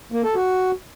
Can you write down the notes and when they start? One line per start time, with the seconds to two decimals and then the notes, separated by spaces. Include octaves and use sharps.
0.12 A#3
0.24 A4
0.35 F#4